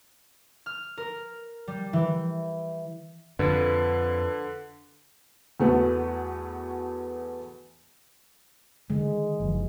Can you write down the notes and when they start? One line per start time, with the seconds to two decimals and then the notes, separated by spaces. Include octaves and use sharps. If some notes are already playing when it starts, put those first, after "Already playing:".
0.66 F6
0.98 A#4
1.68 G3
1.93 E3
3.39 F2 D3 B4
5.60 E2 A3 B3 F#4
8.90 D3 D#3 G#3
9.39 F#1 E3 F3